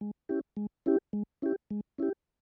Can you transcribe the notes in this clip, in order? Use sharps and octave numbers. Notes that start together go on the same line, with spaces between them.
G#3
C#4 E4 G4
G#3
C#4 E4 G4
G#3
C#4 E4 G4
G#3
C#4 E4 G4